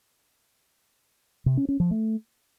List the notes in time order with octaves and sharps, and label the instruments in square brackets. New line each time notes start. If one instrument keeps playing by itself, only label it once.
[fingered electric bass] C3
C#4
C#4
F3
A3